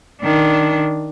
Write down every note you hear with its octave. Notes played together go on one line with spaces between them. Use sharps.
D#3 D4